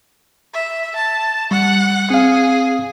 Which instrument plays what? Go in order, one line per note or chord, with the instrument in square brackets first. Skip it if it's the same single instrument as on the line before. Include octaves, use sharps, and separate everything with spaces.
[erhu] E5
A5
[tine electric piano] G3 [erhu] F#5
[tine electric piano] C4 F5 [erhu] G#4